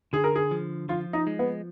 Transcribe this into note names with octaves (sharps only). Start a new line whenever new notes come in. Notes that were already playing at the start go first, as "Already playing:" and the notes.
D3 G#4
A#4
G#4
F3
F3 F4
D#4
G#3
B3